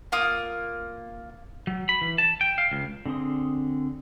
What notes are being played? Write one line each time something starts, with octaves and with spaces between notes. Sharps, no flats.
A#3 F4 D#6
F#3
B5
E3
A5
G5
F5
C#2
D3 C4 G#4 C6 D#6